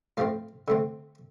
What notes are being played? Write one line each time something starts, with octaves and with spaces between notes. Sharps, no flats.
A2 F3 A3 C4 F5
D3 A3 C4